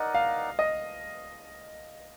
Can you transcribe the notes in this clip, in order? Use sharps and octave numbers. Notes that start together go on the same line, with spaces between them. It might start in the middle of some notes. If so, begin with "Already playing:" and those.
Already playing: D#4 A#4 D5 D#5 F#5
F5
D#5